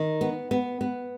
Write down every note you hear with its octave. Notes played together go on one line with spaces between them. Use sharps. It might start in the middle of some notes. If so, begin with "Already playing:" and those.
Already playing: D#3
B3
B3
B3